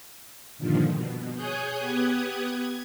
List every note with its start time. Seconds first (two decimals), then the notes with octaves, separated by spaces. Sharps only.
0.58 G2 A#2 D3 D#3 F3
0.93 B2
1.35 G#4 C#5 G#5 D#6 F#6 G6
1.79 B3 G4 D#6 F#6 G#6
2.46 G#6